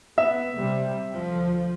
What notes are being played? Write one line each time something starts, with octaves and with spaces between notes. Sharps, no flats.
B3 E5
C3 G3
D2 F3